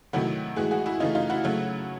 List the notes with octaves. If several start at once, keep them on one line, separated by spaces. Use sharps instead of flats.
C3 D#3 F#3 A3 E4 F#4
A2 E3 G#3 F#4 G#4
F#4 G#4
E4 F#4
C#3 E3 A3 D#4 F4
D#4 F4
E4 F#4
C#3 F#3 A3